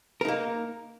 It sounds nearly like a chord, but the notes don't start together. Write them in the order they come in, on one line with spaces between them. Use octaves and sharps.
A#4 D#4 A#3